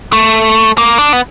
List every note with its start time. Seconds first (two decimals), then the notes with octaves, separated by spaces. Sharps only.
0.13 A3
0.78 A#3
0.98 D4
1.13 B3